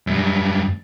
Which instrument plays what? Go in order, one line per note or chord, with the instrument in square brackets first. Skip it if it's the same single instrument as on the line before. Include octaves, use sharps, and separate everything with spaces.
[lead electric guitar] F#2 G3